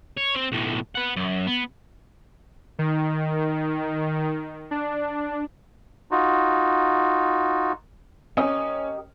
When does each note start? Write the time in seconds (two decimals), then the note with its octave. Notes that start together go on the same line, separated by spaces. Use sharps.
0.17 C#5
0.35 C4
0.52 B1 A2
0.95 B3 F#5
1.17 F#2
1.47 B3
2.79 D#3
4.71 D4
6.11 D#4 F4 F#4
8.37 C#4 G4 A#4 D#5